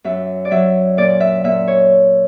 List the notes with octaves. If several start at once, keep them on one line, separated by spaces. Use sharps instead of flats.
F#2 E5
D5
F#3 E5
A#2 D5
E5
A#2 E5
C#5